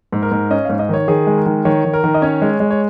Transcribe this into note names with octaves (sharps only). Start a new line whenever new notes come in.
G#2
A#4
G#2
C#4 D#5
G#2 F5
D#5
D#3 C#5
D#3 G#4
G#3
A#4
D#3
D#3 C#5
D#3
A#4
D#3
D#5
C#4 C#5
G#3
G#3
C#5